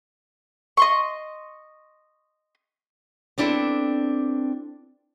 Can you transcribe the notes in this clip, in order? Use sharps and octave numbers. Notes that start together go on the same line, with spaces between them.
D#5 C6 C#6
B3 C4 D4 E4 G#4 A4